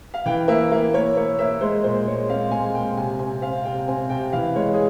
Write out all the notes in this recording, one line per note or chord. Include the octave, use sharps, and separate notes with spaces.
F5
E3 G5
A#3 E5
A#3
A#3 C#5
A#3 C#5
A#3 E5
G#3 C5
A#2 C5
G#3 C#5
C4 F5
G#3 G#5
A#2 G5
C3 G#5
C4 G#5
C4 F5
C3 G5
C4 G#5
C3 G5
E3 F5
G#3 C#5
G#4